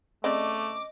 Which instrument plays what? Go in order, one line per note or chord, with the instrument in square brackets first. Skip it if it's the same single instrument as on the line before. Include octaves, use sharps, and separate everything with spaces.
[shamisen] C#3 C4 D5 [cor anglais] A3 [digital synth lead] D#5 [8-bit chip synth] D6